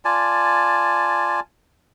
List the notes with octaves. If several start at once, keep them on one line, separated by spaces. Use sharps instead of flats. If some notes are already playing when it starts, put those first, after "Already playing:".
F4 D5 G#5 A5